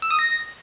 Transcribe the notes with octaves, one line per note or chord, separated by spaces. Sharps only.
E6
D#6
A#6